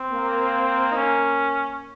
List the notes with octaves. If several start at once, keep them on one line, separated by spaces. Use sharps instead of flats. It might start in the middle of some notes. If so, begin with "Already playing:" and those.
Already playing: C4
A#3
D#4
C#4